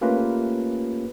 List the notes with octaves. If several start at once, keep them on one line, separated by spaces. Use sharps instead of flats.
A3 A#3 C#4 F4 G4 B4